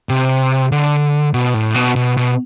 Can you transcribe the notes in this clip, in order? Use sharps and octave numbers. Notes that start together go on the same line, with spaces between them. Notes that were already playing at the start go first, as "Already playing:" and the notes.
C3
D3
B2
A2
B2
B2
B2